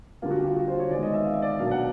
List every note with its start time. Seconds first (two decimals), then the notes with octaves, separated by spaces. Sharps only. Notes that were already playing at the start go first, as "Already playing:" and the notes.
0.22 D3 G3 A#3 F4
0.31 F#4
0.39 G4
0.48 F4
0.56 F#4
0.68 C5
0.79 C#5
0.91 D#3 G#3 B3 D5
1.02 D#5
1.14 E5
1.25 F5
1.34 E5
1.42 D5
1.59 B2 F#3 A#3 D4 F5
1.71 F#5